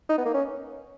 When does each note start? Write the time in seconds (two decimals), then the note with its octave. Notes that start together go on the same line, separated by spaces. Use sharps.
0.09 D#4
0.18 B3
0.25 A#3
0.34 C#4